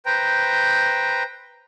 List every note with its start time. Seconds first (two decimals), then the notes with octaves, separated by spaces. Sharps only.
0.06 B4 C5 G5 A#5